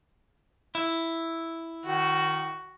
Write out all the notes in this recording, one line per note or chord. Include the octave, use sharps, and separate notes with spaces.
E4
D#3 F#4